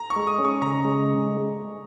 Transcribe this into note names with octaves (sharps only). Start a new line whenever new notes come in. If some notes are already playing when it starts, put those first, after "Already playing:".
Already playing: A#5
C#6
G#3
D#6
C#4
C#6
C#3 A#5
G#3